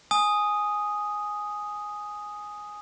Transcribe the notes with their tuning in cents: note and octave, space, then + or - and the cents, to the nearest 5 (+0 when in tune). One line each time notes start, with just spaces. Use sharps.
G#5 +0 D#6 +0